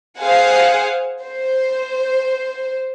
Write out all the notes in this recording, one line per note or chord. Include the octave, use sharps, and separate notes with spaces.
G#4 C5 F5 F#5 G#5
C5